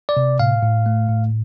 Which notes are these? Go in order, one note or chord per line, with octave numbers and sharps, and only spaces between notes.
D5
C3
A2 F5
A2
A3
A2